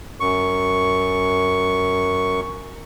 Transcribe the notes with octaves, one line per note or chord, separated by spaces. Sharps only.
F#2 C#6